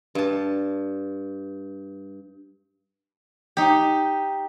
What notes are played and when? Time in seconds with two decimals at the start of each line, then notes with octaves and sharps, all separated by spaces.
0.15 G2 A5
3.57 D#4 G4